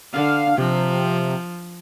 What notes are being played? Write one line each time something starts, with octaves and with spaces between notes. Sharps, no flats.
D3 F5
C3 F3